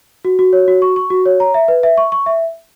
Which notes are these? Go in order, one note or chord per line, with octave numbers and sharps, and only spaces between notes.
F#4
F#4
C#5
F#4
C#6
C#6
F#4
C#5
A#5
E5
B4
E5
C#6
C#6
E5